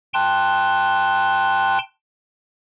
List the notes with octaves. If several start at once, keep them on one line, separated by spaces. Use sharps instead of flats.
G5 A5 C6 F#6